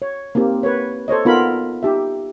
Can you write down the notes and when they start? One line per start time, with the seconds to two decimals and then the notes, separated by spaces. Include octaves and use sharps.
0.02 C#5
0.35 A#3 C4 D#4 G4
0.63 B4 C#5
1.08 A4 C5 C#5 D#5
1.25 B3 D#4 F4 A4 A#4 B5
1.83 D#4 G4 E5